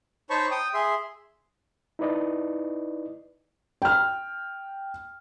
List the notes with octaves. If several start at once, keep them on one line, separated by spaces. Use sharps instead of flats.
D#4 C5 C#5 A5 B5 C#6
G5 D#6
G#4 E5 C6
D#4 E4 B4 D5 D#5
G5 F6